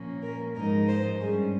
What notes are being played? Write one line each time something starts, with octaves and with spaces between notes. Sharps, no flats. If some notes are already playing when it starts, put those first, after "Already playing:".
Already playing: A#2 F3 A#3 C#4
A#4
G#2 F3 G#3 D#4 A#4
C5
G2 G3 C#4 G#4